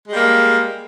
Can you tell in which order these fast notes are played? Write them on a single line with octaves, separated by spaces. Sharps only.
G#3 G3 A#3